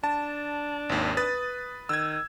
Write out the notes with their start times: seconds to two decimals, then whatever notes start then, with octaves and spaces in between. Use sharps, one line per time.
0.04 D4 A5
0.89 G#1 D#2
1.17 B4 D#6 A6
1.89 D#3 E6 G#6